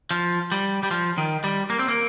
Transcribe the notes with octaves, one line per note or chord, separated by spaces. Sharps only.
F3
G3
G3
F3
D#3
G3
A#3
C4
A#3